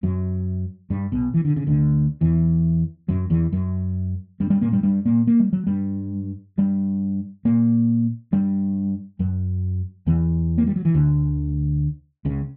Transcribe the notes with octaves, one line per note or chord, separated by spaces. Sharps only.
F#2 F#3
G2 G3
B1 B2
E3
D3
C#3
D2 D3
E2 E3
F#2 F#3
E2 E3
F#2 F#3
G2 G3
G2 G3
A#2 A#3
G2 G3
G2 G3
A#2 A#3
A#3
G3
F#3
G2 G3
G2 G3
A#2 A#3
G2 G3
F#2 F#3
E2 E3
A#3
G3
F#3
E3
D2 D3
C#2 C#3